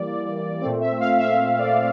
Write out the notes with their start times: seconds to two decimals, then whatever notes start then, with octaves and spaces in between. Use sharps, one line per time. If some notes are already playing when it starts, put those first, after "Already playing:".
Already playing: E3 G3 A#3 D5
0.61 A#2 A3 C4 D5
0.81 E5
1.00 F5
1.20 E5
1.40 E5
1.59 D5